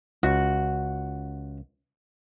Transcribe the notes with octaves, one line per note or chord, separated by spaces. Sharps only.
C#2 F#4